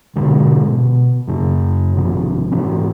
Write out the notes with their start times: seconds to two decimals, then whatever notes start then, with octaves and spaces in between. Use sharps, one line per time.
0.16 G#2 B2 D3 G#3
0.70 B2
1.27 F#2 C#3
1.95 G#1 C3 F3 C4
2.52 G#2 E3 C4 C#4